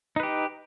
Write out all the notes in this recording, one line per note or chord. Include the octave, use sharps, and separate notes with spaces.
D#4 G4 B4